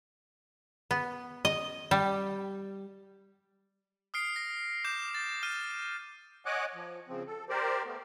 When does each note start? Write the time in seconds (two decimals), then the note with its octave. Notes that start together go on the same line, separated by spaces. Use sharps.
0.91 B3
1.45 D#5
1.91 G3
4.14 D#6 F6 C7 D7
4.36 A#6
4.84 D6 G6 E7
5.15 A6
5.43 F6 D#7
6.46 C#5 D#5 F#5 G#5 D6 F#6
6.75 F3
7.08 C#3 F3 C4
7.27 A4
7.49 G4 A#4 C5 D5
7.86 A3 B3